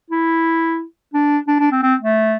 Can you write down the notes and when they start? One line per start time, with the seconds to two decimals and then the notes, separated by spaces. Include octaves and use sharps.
0.10 E4
1.14 D4
1.48 D4
1.60 D4
1.72 C4
1.83 C4
2.01 A3